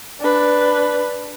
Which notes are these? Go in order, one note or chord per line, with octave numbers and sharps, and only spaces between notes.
D4 B4